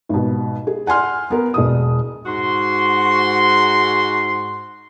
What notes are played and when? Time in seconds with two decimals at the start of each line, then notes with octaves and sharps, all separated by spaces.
0.09 G#1 B2
0.67 G#4
0.87 F#5 G#5 C6 F6
1.30 B3 A#4
1.54 E1 B2 D#6
2.26 G#2 F#4 C6